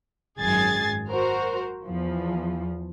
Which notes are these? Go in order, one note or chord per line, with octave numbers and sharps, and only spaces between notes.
G#1 F#2 G#4 G#6 A6 C7
F#4 A#4 C5
E2 F3